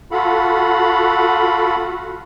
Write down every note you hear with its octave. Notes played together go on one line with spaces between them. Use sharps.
F4 F#4 A4 F5 F#5 B5